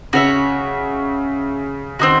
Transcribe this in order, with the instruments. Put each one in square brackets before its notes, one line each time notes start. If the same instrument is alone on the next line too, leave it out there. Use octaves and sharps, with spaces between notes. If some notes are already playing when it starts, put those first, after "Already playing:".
[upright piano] C#3 [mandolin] F#4 C#5 E5
[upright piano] D#3 [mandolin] C4 D#4 F#4